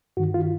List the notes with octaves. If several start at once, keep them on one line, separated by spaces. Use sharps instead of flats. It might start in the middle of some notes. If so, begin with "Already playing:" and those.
G2 D#3 F#4
F4